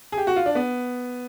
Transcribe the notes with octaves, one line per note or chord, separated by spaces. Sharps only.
G#4
G4
F#4
F4
D4
B3